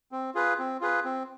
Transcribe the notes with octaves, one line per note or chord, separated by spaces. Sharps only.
C4
F4 G#4 B4
C4
F4 G#4 B4
C4